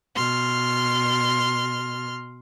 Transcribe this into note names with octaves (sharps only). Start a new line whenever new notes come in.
B2 C6 F6